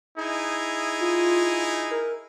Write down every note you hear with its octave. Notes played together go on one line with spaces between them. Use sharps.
D#4 E4 G#4
F4
A#4